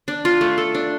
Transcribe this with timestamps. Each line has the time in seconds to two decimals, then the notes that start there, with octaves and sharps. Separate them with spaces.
0.08 D4
0.25 F4
0.41 A3
0.58 A4
0.75 D4